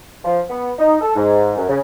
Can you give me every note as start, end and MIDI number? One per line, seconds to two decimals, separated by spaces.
0.25 0.40 53
0.49 0.72 59
0.79 0.97 63
1.01 1.14 69
1.15 1.55 44
1.57 1.66 42
1.69 1.78 49